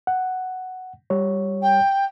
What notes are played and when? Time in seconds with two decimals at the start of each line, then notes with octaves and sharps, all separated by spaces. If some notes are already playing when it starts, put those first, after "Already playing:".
0.07 F#5
1.10 G3 C#5
1.62 G5